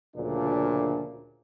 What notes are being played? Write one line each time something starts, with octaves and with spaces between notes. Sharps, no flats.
D2 A#2 C#3 F3 D4